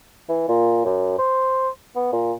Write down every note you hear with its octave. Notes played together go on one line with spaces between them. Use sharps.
E3
A#2
F#2
C5
B3
A#2